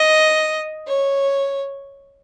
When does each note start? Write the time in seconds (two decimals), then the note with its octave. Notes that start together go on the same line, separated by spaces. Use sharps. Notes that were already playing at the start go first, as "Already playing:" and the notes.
Already playing: D#5
0.87 C#5